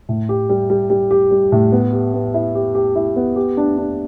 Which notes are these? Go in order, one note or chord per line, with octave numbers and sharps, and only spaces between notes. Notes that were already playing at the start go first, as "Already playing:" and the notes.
A2
G4
G3
G3
G3
G4
G3
A2
B3
G4
B3
E4
G4
G4
E4
B3
G4
D4
D4